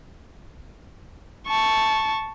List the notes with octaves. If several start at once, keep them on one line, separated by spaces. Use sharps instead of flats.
A5 C#6